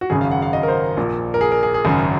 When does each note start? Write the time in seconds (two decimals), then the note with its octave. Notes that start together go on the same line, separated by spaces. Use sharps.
0.01 F#4
0.10 G#1 F#2 C#3 G#4
0.21 F5
0.31 F#5
0.42 F5
0.53 D#5
0.63 A#4
0.68 C5
0.97 A#1 A#2
1.34 A#4
1.41 G#4
1.52 A#4
1.63 G#4
1.74 G#4
1.85 G#1 F#2 C#3